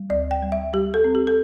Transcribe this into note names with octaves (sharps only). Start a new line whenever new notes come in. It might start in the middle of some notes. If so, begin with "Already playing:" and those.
Already playing: G3
D2 D5
G5
G3
E5
G3 G4
A4
C4
G4
A4